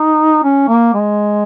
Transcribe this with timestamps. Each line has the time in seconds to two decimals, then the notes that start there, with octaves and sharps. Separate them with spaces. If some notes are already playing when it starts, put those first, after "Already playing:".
Already playing: D#4
0.44 C#4
0.68 A#3
0.94 G#3